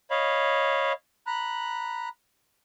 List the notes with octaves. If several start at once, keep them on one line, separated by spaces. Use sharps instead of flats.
C#5 D#5 F5 B5
A#5 B5 F#6